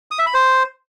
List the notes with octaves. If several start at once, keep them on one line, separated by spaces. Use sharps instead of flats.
D#6
E5
B5
C5